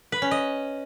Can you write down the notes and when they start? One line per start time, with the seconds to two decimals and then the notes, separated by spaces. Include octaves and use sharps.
0.12 B4
0.22 C#4
0.31 D#5